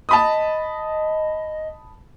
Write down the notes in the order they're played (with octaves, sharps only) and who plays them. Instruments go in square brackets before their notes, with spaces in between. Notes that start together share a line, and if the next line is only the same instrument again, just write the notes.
[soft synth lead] D#5 [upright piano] A5 B5 D#6